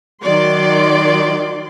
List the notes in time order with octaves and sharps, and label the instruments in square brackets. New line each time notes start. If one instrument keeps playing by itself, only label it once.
[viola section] D#3 F#3 D5 C6